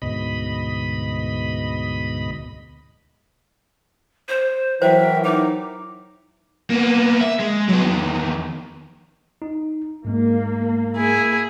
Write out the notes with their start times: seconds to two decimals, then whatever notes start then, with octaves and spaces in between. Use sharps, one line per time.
0.02 D2 G#2 B2 D#5 B5
4.28 C5
4.82 E3 F#3 A#4 C5 E5 G5
5.24 D#4 D6
6.70 A#3 B3
7.20 E5
7.39 G#3
7.68 F#3 B3
7.82 E2 D#3
9.42 D#4
10.05 G#2 G#3 A#3
10.97 E4 G#4